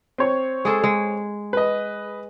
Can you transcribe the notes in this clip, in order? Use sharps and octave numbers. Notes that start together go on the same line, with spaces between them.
C4 C#5 C#6
G#3 G#4 A4
G#3
B4 D#5